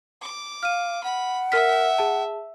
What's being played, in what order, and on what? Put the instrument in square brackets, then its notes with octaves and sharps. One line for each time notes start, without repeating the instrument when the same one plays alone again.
[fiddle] D6
[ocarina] F5 [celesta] F6 D#7
[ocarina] F#5 [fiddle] B5
[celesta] A#4 F6 B6 [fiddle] E5
[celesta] G#4 A5